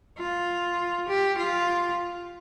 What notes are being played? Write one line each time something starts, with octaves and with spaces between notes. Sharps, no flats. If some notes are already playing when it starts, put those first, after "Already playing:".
F4
G4
F4